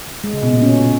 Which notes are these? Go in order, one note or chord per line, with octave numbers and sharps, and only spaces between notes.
G#3
C#3
B2
A#2
C#4